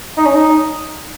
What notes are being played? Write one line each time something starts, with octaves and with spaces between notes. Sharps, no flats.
D#4
C#4
D#4